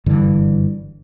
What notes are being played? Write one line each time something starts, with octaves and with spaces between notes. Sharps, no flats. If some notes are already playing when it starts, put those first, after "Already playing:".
F#1 G2 D3 E3